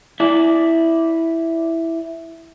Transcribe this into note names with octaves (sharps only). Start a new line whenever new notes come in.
E4 D5